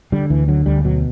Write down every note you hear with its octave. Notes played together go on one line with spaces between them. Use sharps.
D3 G3
D2 E3
D3 F#3
D2 G3
B2 F#3